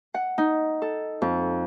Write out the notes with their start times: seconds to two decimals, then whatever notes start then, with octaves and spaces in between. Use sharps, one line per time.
0.14 F#5
0.38 D#4
0.82 A4
1.22 F2